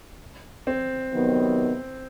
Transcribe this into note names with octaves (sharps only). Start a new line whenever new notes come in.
C4
C3 D#3 F#3 B3